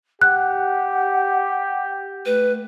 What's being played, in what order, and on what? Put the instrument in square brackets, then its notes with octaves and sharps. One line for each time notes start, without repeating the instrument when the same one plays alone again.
[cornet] G4 [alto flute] F#5 [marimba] F#6
[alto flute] A3 [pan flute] B4